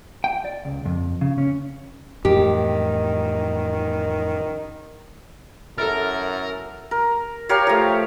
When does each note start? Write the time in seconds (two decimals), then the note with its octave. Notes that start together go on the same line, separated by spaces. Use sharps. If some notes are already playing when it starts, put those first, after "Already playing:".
0.24 G5
0.45 D5
0.65 C#2
0.85 F2
1.21 C#3
1.38 C#4
2.25 F2 A2 D#3 E3 G4
5.78 F#2 E4 A4 A#4 F6 A6
6.91 A#4
7.49 G4 A#4 C#5 F5
7.67 F3 A3